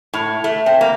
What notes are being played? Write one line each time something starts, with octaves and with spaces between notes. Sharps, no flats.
A2
A3
C4
A#3